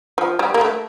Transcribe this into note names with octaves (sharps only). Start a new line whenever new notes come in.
F3
G3
A#3
A3